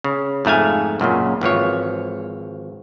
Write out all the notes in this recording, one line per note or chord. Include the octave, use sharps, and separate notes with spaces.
C#3
F2 G#2 A3 F5 G#5
C#2 F#2 A#2 C#3
G#1 E3 F3 C#5